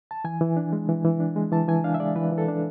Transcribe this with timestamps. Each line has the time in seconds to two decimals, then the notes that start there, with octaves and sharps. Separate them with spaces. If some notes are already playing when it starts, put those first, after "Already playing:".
0.11 A5
0.24 E3 G#5
0.41 E3
0.57 D4
0.73 G#3
0.89 E3
1.04 E3
1.20 D4
1.36 G#3
1.52 E3 A5
1.68 E3 G#5
1.84 D4 F5
1.94 E5
2.00 G#3 D5
2.16 E3 B4
2.32 E3
2.38 A4
2.48 D4